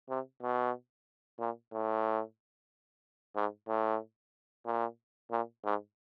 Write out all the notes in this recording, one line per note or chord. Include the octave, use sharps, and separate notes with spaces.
C3
B2
A#2
A2
G#2
A2
A#2
A#2
G#2